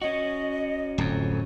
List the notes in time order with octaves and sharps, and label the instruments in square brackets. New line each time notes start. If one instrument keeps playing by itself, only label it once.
[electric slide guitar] C#4 F#4 [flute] D#5
[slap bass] D1 F2